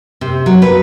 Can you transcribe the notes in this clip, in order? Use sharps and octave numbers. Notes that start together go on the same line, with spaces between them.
C3
F#3
B4